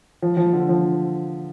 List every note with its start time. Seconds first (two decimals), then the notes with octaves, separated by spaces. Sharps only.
0.22 F3
0.37 F3
0.53 D3
0.69 F3